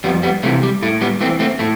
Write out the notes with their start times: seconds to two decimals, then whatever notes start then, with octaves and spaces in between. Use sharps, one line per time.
0.04 F2 G3 B3
0.23 G3 B3
0.43 C3 E3 A3
0.63 G3
0.82 A2 A3
1.01 G3 B3
1.21 E3 A3 C4
1.40 A3 C4
1.59 A2 A3